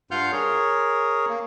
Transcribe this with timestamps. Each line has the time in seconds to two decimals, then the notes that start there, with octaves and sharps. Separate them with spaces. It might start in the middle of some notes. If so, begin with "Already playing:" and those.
0.11 G2 F4 F5 F#5 F6 G6
0.32 G#4 A#4 C#5
1.29 A#3